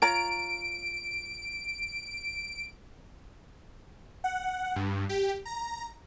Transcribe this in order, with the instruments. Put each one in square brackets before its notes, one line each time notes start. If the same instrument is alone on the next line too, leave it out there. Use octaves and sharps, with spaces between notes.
[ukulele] F4 C#5 A#5 [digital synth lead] D7
[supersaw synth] F#5
G2
G4
A#5